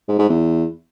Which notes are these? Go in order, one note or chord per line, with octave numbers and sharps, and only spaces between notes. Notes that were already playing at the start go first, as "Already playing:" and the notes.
G#2
G#2
E2